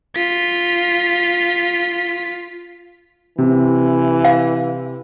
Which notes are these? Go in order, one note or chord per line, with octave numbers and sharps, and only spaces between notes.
F4 B6
C3 E3
F5